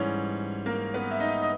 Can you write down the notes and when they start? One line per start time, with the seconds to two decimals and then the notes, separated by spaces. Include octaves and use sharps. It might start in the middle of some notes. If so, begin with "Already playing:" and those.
Already playing: G#2 E3 G3 C#4 C#5
0.66 A#3 A#4
0.94 B3 B4
1.11 E5
1.20 D#4 D#5
1.42 D#5